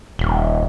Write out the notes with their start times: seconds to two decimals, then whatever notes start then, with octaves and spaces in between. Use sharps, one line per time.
0.19 D#1